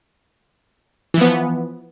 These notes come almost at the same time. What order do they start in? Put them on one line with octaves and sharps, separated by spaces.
E3 F3 B3